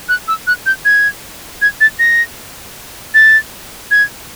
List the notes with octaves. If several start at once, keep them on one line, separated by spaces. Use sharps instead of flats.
F#6
E6
F#6
G6
G#6
G#6
A6
A#6
A6
G#6